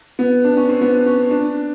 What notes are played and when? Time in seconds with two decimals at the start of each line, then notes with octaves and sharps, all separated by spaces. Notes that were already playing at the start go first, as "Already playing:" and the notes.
0.19 B3
0.44 D4
0.57 C#4
0.69 C4
0.81 B3
1.06 C#4
1.31 D4